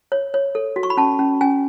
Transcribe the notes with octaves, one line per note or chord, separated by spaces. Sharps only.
C#5
C#5
A4
F#4
C#6
B5
C#4 A5
C#4
C#4 G#5